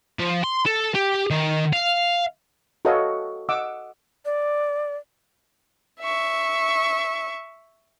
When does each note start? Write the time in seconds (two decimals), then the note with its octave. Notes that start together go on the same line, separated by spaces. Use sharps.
0.19 F3
0.44 C6
0.66 A4
0.95 G4
1.31 D#3
1.73 F5
2.85 F#4 A4 B4 C#5 D#5 F5
3.49 D#5 F#5 D6 E6
4.25 D5
6.01 E5 C#6